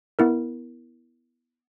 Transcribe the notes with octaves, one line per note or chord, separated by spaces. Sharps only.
B3 E4 A#4